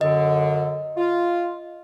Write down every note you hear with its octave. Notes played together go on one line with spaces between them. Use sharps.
F#2 D3 D#5
F4